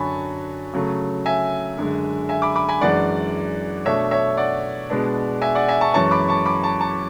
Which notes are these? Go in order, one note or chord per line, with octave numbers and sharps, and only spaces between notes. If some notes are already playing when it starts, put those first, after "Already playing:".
Already playing: F#2 D3 F#3 G#5 A5 B5 C#6
C#3 F#3 A3
E5 G#5
F#2 D3 G#3
E5 G#5
B5 D6
B5 D6
G#5 B5
F#2 E3 G#3 D4 D5 F#5
B2 A3 D4 C#5 E5
C#5 E5
D5 F#5
B2 G#3 B3 D4
E5 G#5
D5 F#5
E5 G#5
A5 C#6
F#2 E3 G#3 C#4 A5 C#6
B5 D6
A5 C#6
B5 D6
A5 C#6
A5 C#6